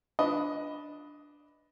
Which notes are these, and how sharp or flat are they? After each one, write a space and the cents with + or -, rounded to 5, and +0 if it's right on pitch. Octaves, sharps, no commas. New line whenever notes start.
D4 +0 B4 +0 D#5 +15